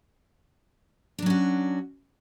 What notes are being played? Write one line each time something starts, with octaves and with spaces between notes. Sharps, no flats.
F#3 C#4 D4 F#4